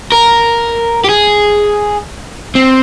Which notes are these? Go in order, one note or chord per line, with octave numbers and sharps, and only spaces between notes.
A#4
G4
G#4
C4